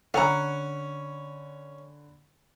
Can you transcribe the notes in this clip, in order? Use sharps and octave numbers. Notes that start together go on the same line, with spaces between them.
D3 C#4 A4 F#5 G#5 A#5 B5